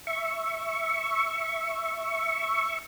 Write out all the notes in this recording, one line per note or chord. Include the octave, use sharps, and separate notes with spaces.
E5 C#6